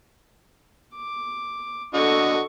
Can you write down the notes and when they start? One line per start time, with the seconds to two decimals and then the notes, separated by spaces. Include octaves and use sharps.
0.95 D6
1.94 D3 F#4 A4 D#5 C#6